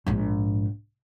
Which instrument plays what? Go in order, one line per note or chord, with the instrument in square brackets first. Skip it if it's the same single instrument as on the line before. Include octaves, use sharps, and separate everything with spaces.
[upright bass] A#1 G#2